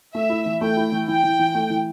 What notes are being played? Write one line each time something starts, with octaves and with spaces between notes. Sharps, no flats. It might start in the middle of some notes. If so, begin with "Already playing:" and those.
A3 E5
E4
E3
A3 G5
E4
E3
E3 G5
E3
E3
A3
E3